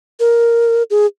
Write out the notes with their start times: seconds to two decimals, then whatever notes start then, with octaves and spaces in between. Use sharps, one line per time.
0.20 A#4
0.90 G#4